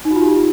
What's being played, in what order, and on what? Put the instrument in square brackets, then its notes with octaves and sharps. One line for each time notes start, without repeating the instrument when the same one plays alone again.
[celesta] D#4
F#4
F4
G4